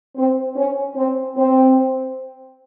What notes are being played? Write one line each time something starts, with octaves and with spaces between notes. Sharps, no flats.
C4
C#4
C4
C4